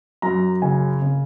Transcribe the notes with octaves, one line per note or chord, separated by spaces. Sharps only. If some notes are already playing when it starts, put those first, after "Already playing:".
F#2 A#5
C#3 G#5
C#3